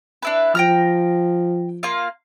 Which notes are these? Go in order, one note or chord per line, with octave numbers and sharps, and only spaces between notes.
D4 E4 B4
F3 G5 A#5 F6
A#3 F4 F5